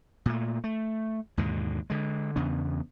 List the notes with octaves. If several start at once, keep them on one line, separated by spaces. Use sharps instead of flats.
A#2 A3
A3
D#2 G#2 B2 D3
D3 G#3
E2 C#3 B3 D4